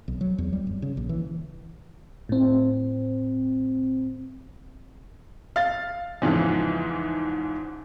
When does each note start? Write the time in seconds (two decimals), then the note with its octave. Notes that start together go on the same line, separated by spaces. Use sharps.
0.08 B1
0.21 F#3
0.38 E2
0.53 G3
0.67 G1
0.82 C#3
0.97 A#1
1.09 E3
2.29 A2 C4
5.56 F5 A6
6.22 E2 G#2 C#3 E3 F3